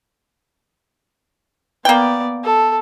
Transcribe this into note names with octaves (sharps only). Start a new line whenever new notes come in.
A#3 B3 D5 G5
A4